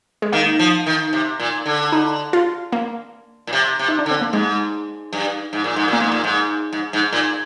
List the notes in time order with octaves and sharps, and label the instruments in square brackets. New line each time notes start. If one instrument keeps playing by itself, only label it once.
[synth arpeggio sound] G#3
[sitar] D#3 [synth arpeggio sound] A#3
[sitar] F3
D#3
C3
A#2
D3
[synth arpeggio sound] D#4
F4
A#3
[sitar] A#2
C3
C3
[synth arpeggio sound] D#4
D4
[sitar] D3
[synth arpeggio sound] C4
A#3
[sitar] G#2 [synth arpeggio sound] G#3
[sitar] G2
G#2
A#2
G#2
[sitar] A#2 [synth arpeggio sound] A#3
[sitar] G#2
A#2
G#2
G#2
G#2
A#2